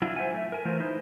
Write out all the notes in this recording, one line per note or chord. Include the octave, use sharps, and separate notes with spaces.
F#3 D4 E4 F4
C5 E5 F#5 G#5
A3 E5
A#4 G#5
E3 A3 F4 A#4 C5
D#4 E4 C5